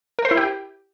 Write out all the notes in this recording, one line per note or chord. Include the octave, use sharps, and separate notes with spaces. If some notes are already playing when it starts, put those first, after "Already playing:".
A#4
C5
E4
G4